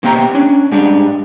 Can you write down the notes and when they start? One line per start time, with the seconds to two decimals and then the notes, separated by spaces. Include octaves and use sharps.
0.03 B2 A#3 C4 G4 G5 A#5
0.35 C#4 D4
0.72 G#2 G3 D4 G4